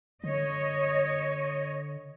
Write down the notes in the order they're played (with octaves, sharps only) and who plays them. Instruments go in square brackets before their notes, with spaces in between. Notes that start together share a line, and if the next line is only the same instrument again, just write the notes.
[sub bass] D3 [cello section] C#5 D#5